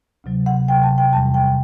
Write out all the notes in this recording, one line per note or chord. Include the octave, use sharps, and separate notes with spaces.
D2 C3 F#3
F#5
D2 C3 F#3 G5
A5
G5
E2 C3 E3 G3 A5
G5